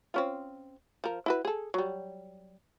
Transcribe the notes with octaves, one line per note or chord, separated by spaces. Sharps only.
C4 C#4 F4
F3 A#4
E4 F#4 B4
G#4 A4
F#3 G3